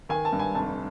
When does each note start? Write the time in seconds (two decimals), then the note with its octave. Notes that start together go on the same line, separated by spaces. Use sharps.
0.09 D#3 G#5
0.25 A5
0.33 G2
0.39 G#5
0.55 F1 A5